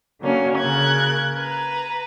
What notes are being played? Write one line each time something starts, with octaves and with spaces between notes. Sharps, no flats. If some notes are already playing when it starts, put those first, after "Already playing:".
D3 F#3 A#3 C#4
C#3 A#4 F#6 G#6
B4 A#5